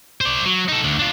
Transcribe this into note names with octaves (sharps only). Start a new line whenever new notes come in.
C5 D5
F#3
D#4 A4
D2 D3
D4 F4